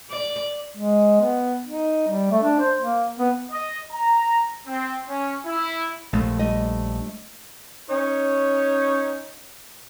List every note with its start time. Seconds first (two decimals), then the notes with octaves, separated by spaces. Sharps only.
0.11 D5
0.77 G#3
1.21 B3
1.66 D#4
2.08 G3
2.31 A3
2.43 D4
2.60 C5
2.81 A#3
3.19 B3
3.51 D#5
3.92 A#5
4.67 C4
5.09 C#4
5.45 E4
6.13 A#1 D#2 A3
6.39 G3 A3 D#5
7.90 C#4 D#4 C#5